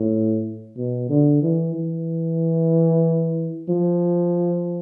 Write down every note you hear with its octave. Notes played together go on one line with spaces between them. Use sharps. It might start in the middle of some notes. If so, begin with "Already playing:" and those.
Already playing: A2
B2
D3
E3
E3
F3